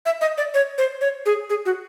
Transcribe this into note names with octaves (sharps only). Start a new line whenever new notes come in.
E5
D#5
D5
C#5
C5
C#5
G#4
G#4
F#4